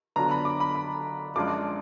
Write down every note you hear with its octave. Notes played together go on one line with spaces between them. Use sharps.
D3 F#3 B3 D4 F4 A#5
B5
D6
B5
B5
F#2 F3 G#3 D4 F4 D6